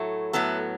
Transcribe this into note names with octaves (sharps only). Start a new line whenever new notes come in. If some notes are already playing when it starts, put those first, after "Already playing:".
Already playing: A2 F#3 A3
A2 F#3 B3 A4